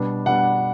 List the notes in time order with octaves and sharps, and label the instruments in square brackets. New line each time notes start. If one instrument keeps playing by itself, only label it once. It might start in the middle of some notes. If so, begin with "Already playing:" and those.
Already playing: [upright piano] B2 G3 B3 D4
[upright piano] B2 G3 B3 D4 [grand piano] F#5